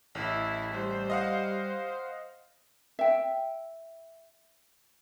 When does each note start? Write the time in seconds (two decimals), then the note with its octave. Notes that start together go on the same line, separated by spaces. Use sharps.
0.15 A1 E4
0.73 G3 C5
1.10 D#5 F5 F#5
2.99 E5 G5